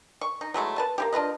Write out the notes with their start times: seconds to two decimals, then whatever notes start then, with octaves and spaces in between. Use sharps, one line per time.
0.21 C#6
0.41 D#4
0.54 F#3 G#3 A3 E4
0.78 B4 A5
0.98 A#3 E4 G4
1.13 D4 F4 B4 D#5